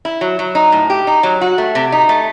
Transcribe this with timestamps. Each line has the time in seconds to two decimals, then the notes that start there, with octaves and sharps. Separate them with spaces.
0.05 E4
0.21 F#3
0.39 F#3
0.55 D#4
0.72 A2
0.90 G4
1.07 D#4
1.23 F#3
1.41 F#4
1.58 A3
1.75 C3
1.92 D#4
2.09 A3